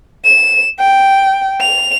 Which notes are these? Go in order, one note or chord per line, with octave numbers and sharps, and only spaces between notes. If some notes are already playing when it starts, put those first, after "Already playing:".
E7
G5
F7